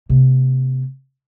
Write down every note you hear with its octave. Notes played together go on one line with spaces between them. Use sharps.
C3 A#3